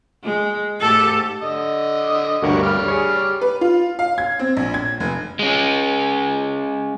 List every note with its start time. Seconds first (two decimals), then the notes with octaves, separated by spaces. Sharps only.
0.24 G#3
0.81 G#2 A3 G4 A4
1.41 D3 D#5 D#6
2.42 D2 G2 A#3 F#4 G4 C#5
2.63 G3 D5 F6
2.88 G#4 C#5
3.41 B4
3.61 F4
3.99 F5
4.18 G#6
4.39 C4
4.57 A#1
4.74 G#6
5.00 F1
5.39 G#3 C#4